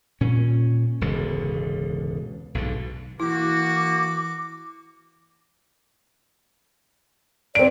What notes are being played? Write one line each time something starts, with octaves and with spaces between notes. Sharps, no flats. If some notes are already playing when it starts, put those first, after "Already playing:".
A#2 C#4
E1 C#2 G#2 D3
B1 G#2 D3
E3 A#3 E4 F#4 D6
C4 D5 D7